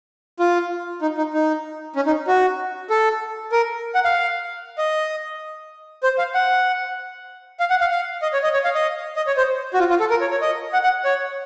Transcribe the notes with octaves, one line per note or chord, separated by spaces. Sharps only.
F4
D#4
D#4
D#4
C#4
D#4
F#4
A4
A#4
F#5
F5
D#5
C5
F5
F#5
F5
F#5
F5
F5
D#5
C#5
D#5
C#5
F5
D#5
D#5
C#5
C5
F#4
F4
F4
A4
A#4
C#5
C#5
D#5
F#5
F#5
C#5